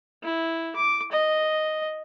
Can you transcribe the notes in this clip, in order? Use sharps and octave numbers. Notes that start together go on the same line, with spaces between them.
E4
D6
D#5